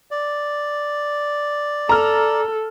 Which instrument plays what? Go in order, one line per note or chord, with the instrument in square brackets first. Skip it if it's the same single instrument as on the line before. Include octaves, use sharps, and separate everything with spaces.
[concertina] D5
[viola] A4 [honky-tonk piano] A#5 F6